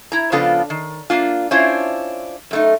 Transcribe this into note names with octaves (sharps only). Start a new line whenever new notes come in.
E4 A#5
C#3 F3 B3 D4 F4 A4
D#3
A#3 D4 F4
C#4 D4 E4 F4 C5 C#5
F#2 A3 D#4